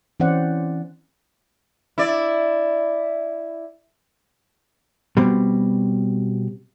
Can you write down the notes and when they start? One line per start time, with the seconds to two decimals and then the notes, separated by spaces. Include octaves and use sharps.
0.20 E3 C4 C#4 C5 D5 F#5
1.98 E4 D5
5.17 B2 G3 C4